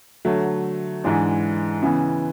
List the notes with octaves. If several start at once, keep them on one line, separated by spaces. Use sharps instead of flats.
D3 F#3 A3
G#2 E3 G#3 D4
C#3 E3 B3